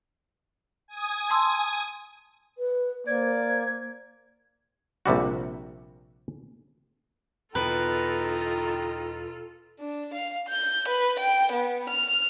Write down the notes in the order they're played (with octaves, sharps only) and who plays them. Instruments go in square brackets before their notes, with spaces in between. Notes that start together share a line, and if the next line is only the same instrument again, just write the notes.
[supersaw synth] G#5 D#6
[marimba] A5 C6 E6
[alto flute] B4
[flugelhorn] A#3 [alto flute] C5 [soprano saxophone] D5 [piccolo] G#6
[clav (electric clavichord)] A#1 C3 G3 F#4
[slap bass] E2 B2 [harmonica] D#4 G5 A#5 [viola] F4 A4 [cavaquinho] B4
[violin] D4
F5
G6
B4
G5
B3
F6